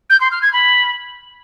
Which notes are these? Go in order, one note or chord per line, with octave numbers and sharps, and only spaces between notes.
G6
C6
F6
G#6
B5